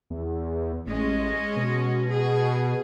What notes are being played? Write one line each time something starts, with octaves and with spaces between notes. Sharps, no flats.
E2
A1 G#3 C#4 D#5
B2
G#4